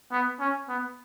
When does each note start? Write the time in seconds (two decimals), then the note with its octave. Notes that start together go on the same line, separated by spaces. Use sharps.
0.12 B3
0.40 C#4
0.69 B3